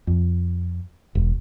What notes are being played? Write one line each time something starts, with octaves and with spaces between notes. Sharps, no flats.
F2
E1